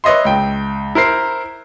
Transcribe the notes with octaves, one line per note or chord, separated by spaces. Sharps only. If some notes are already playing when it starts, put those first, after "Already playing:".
B4 C#5 D#5 E5 C6
C#2 G5
E4 A#4 C5 C7